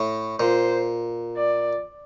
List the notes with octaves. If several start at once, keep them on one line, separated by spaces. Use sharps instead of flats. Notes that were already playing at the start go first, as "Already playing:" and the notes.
Already playing: A2
A#2 C5
D5